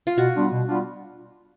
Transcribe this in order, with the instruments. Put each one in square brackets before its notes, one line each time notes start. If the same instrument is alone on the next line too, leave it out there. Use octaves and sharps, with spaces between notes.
[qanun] F4
[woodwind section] B2 [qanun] F#4
[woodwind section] G3 B3 D4 F4
B2
G3 B3 D4 F4